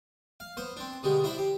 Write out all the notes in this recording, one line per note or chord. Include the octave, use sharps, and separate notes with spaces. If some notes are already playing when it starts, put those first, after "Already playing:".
F5
B3 C5
C4 D4
B2 D3 G3 G#3 G4
D4 E4 C5 E5 B5
G4